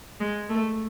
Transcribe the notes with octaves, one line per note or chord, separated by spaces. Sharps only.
G#3
A3